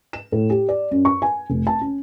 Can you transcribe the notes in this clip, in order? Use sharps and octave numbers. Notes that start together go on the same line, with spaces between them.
E7
A2
G4
D5
F#2
C#6
G#5
F1
A5
C#4